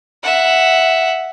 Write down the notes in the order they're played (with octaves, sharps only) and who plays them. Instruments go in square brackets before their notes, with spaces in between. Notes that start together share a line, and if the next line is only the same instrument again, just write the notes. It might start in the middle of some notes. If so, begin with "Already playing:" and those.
[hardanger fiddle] E5 F#5